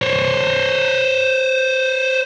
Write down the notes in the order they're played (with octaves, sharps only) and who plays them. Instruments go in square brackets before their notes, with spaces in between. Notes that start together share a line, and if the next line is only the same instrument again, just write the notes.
[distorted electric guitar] C5 C#5